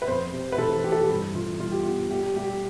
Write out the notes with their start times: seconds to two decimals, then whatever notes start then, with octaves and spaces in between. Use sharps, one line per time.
0.02 B4
0.08 F2 C5
0.33 C3
0.52 B4
0.58 E3 A4
0.84 E3 G4
0.92 A4
1.00 G4
1.09 G2
1.34 E3 F4
1.60 G2 F4
1.72 G4
1.83 B3 F4
2.10 G3 G4
2.36 G3 G4